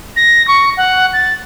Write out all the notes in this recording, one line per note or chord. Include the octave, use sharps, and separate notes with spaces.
A#6
C#6
F#5
A6